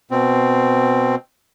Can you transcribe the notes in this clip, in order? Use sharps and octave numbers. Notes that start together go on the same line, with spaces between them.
B2 C4